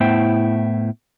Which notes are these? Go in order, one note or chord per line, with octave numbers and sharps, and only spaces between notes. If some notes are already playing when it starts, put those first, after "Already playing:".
A2 B3 E4 C5 G5